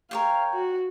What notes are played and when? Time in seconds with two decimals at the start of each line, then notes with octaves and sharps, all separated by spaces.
0.11 A#4 C#5 F5 G5
0.54 F#4